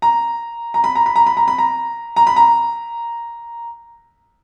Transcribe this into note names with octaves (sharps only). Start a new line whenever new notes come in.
A#5
A#5
B5
A#5
B5
A#5
B5
A#5
B5
A#5
A#5
B5
A#5